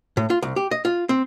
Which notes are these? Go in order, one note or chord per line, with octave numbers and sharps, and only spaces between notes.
A2
F4
C2
G4
D#5
F4
C4